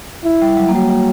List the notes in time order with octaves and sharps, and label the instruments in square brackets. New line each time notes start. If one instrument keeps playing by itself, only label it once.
[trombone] E4
[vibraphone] G3
F#3
A#3
[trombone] F#3 [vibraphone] G3